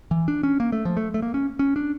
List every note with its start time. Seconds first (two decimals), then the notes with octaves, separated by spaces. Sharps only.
0.11 E3
0.28 D4
0.43 C#4
0.60 A#3
0.72 A3
0.85 F3
0.97 A3
1.14 A3
1.22 A#3
1.34 C#4
1.59 C#4
1.76 D4